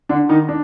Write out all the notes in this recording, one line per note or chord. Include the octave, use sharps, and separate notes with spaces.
D3 D4
D#3 D#4
D4